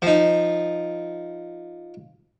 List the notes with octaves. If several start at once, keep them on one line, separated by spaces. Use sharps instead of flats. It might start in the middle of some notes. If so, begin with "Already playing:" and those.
F3 D#4